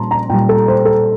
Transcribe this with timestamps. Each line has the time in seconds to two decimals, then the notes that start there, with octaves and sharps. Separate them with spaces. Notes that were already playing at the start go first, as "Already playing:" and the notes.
Already playing: A#2 G3 A5 A#5 C6
0.11 A#5
0.30 A#2 G3 G5
0.49 A4
0.68 C5
0.85 A4